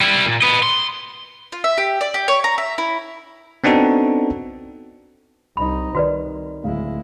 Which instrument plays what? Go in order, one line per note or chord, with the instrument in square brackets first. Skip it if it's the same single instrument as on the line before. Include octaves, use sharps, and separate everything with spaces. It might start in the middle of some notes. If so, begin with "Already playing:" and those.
[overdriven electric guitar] G3 E4
A#2
B4 D#5
C6
[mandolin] F4
E5
G4
D5
G4
C#5
A#5
E5
E4
[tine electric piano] B3 C4 D4 D#4 F#4 A4
[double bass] C2 D#4 [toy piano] B5
[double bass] C2 [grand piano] D#3 [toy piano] F#4 B4 D5
[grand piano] D1 F5 [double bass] G#3 E4